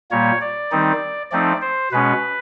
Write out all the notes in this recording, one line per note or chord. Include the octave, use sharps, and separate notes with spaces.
A#2 G3 A#3 C#5
D5
D#3 G3 C4 D#4
F3 A3 C4 D#4 D5
C5
B2 G#3 C#4 B4